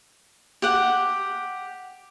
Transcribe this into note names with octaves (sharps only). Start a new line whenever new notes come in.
G4 F#5